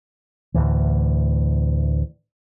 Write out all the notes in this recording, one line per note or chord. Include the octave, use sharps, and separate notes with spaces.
D2 A2 E3